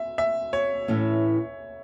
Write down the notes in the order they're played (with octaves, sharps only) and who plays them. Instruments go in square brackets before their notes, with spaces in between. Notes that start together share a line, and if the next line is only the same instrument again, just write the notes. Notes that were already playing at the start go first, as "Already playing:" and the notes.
Already playing: [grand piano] E5
E5
C#5
[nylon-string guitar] A2 E3 A3 C#4